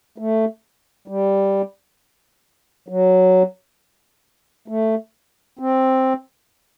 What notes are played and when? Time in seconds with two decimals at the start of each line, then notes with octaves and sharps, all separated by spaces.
0.18 A3
1.08 G3
2.88 F#3
4.68 A3
5.59 C4